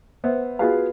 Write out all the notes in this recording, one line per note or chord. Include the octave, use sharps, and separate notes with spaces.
B3 C5 E5 F#5
B3 F4 F#4 G#4 B4 F5